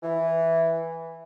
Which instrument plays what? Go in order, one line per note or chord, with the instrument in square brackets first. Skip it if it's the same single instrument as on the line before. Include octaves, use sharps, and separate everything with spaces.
[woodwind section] E3